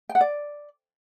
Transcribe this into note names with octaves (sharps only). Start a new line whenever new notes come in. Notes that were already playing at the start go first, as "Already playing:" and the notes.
G5
F#5
D5